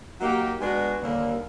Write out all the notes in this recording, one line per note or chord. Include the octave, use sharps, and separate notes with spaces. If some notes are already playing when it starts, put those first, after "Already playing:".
F#3 A#3 D#4 G4
G#3 B3 D4 F#4
D#2 D3 G3 A#3